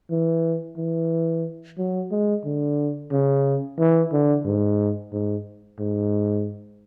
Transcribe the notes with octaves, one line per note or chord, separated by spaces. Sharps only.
E3
E3
F#3
G#3
D3
C#3
E3
D3
G#2
G#2
G#2